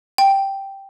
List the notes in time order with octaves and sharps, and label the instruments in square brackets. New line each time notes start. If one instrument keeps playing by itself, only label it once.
[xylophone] G5